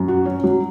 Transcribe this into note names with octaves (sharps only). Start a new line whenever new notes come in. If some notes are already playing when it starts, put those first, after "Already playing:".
Already playing: F#2
F#4
C#4
F#3